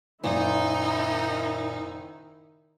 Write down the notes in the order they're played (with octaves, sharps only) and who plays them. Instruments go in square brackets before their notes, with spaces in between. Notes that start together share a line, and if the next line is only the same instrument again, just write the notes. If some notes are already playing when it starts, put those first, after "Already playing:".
[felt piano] F#1 [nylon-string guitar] A#2 [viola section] D#3 E4 [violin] D#4